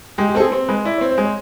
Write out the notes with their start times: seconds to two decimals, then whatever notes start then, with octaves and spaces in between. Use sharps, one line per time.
0.18 G#3 G4
0.29 G4
0.35 C4 A4
0.40 G#4
0.52 C4
0.69 G#3 B4
0.85 E4 D5
0.98 C4 C#5
1.11 C5
1.18 G#3
1.25 C#5